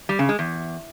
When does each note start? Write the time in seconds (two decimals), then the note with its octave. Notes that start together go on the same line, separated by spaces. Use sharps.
0.09 G3
0.19 C#3
0.29 G#3
0.39 E2